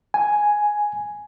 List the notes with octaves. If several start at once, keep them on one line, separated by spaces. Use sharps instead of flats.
G#5